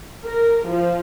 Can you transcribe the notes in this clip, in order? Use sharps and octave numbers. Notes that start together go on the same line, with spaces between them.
A#4
F3